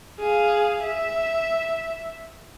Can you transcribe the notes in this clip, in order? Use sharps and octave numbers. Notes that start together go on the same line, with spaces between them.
G#4 F5
E5